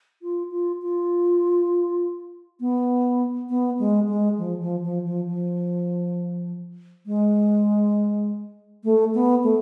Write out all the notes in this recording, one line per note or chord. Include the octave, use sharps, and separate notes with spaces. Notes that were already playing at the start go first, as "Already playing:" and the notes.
F4
F4
F4
B3
B3
G#3
G#3
F3
F3
F3
F3
F3
G#3
A3
B3
A3